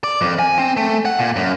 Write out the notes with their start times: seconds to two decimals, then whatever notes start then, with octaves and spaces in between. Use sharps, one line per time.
0.04 D5
0.21 F2
0.39 G#5
0.58 C4
0.77 A3
1.05 F#5
1.19 A#2
1.36 F#2